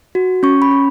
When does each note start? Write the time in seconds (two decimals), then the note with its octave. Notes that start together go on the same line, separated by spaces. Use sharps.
0.15 F#4
0.43 C#4 C#6
0.62 B5
0.71 C#4